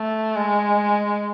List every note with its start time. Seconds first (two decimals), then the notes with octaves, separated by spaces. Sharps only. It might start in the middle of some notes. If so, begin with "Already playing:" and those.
Already playing: A3
0.36 G#3